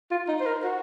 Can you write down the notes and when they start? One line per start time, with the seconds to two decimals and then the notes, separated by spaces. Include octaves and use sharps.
0.10 F4
0.28 D#4
0.40 C5
0.46 A#4
0.64 F#4